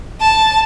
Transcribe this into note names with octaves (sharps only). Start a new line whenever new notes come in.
A5